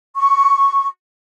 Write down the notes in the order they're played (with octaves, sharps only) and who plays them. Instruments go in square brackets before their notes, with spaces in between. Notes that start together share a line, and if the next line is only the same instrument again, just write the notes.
[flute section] C#6